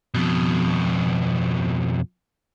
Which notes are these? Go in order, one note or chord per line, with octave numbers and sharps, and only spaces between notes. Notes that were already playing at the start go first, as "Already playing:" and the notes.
F2 B2